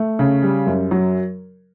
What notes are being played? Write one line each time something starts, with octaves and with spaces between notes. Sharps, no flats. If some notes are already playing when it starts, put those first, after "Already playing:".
Already playing: A3
C#3
G3
F#2
F#3